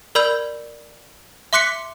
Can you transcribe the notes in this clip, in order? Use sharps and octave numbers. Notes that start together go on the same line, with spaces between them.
A#4 D5 B5 E6 G6
E5 C6 D6 F#6 B6 C#7